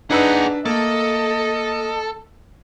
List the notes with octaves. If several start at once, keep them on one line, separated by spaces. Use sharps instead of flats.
D4 D#4 G#4 B4 F#5 E6
A3 A#3 A4 D#5